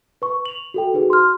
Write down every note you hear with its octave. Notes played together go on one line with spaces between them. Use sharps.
B4 C#6
F7 F#7
F#4 A4 G5
D#4 F#4 G#4 B4
C6 F6